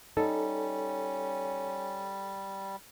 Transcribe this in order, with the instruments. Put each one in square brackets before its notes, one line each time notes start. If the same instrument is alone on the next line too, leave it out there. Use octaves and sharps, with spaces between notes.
[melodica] G3 [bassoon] C#4 [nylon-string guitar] D#4 [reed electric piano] A4